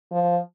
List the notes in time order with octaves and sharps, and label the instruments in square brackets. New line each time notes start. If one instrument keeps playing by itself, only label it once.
[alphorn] F3